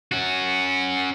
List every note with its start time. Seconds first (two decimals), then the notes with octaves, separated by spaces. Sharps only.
0.12 C#4 F#4